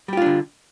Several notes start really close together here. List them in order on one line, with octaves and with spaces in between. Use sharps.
G3 G4 F4 D4 D3